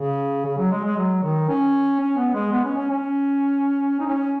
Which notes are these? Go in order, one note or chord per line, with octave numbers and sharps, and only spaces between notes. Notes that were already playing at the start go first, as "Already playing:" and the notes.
Already playing: C#3
C#3
F#3
G#3
G#3
F#3
D#3
C#4
C#4
B3
G#3
B3
C#4
C#4
C#4
D#4
C#4